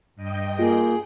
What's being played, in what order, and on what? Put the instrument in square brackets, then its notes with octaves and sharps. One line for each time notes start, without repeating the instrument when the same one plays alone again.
[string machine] G2 D#5 G5
[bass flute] A#3 [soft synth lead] F4 [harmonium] G#4